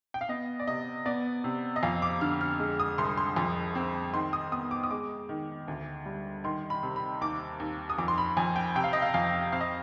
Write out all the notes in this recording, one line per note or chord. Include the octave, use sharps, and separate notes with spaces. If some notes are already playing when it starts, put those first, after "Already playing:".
G5
F5
B3 D#5
D5
C3 D#5
B3 D5
C3
D#5
F2 F5
D6
D3 F6
F6
G#3
D#6
C2 C6
C6
F2 C6
C4
D#3 C6
D#6
B3 D#6
D6
D#6
G#3 D6
D#3
D2
G3
D#3 C6
B5
C3
B5
D#2 D6
D#2
D#6
F2 D6
C6
B5
F2 G#5
G5
C3 G5
F5
D#5
F5
F2 F5
C4 F5
D#5